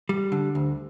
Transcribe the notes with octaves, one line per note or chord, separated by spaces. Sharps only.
G3
D3
D2